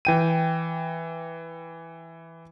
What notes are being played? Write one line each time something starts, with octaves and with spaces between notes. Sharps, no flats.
E3 G5 D#7